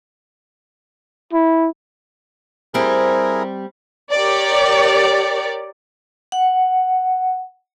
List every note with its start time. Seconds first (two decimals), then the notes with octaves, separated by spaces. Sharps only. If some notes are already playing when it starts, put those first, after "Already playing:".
1.33 E4
2.74 G3 C4 E4 G#4 A#4
4.12 G4 A#4 C#5 D5
6.32 F#5